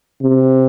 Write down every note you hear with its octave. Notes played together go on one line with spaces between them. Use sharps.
C3